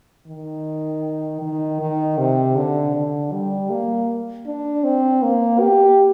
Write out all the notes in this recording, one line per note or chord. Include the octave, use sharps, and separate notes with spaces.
D#3
D#3
D#3
C3
D3
D3
G3
A#3
D4
C4
A#3
G4